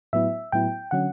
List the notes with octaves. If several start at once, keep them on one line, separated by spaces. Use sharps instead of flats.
A2 F#3 B3 E4 E5
A2 F#3 B3 E4 G5
D3 F#3 C#4 F#5